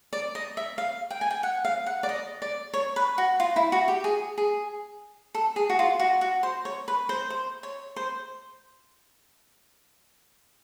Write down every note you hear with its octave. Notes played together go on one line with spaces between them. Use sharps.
D5
D#5
E5
F5
G5
G#5
G5
F#5
F5
F#5
D5
D#5
D5
C#5
B4
F#4
F4
E4
F#4
G4
G#4
G#4
A4
G#4
F#4
F4
F#4
F#4
C5
C#5
B4
C5
C5
C#5
C5